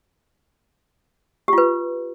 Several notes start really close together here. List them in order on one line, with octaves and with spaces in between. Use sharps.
G4 F4 B4